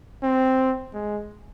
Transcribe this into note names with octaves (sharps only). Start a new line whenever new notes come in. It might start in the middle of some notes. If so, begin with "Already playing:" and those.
C4
G#3